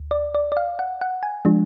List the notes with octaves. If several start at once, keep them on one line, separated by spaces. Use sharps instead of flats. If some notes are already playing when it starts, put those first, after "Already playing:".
Already playing: D2
D5
D5
D5
F5
F#5
F#5
G#5
F3 G#3 D4